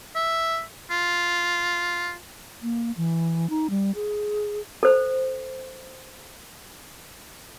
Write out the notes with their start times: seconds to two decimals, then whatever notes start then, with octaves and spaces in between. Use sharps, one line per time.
0.15 E5
0.91 F4
2.63 A#3
2.97 E3
3.50 D#4
3.70 G3
3.95 G#4
4.83 A4 C5